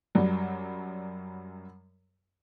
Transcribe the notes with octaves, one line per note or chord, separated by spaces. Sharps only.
F#2 F#3 G3